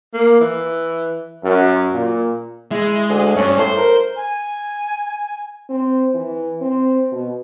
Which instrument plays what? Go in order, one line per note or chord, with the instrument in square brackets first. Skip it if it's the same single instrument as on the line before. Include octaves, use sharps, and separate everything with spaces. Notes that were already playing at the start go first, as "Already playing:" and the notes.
[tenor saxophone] A#3
E3
[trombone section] F#2
A#2
[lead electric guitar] G#3 [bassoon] E4
[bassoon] D2
[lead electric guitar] G2 [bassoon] C#4
[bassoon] A2 [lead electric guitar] C5
[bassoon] A#4
[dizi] G#5
[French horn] C4
E3
C4
B2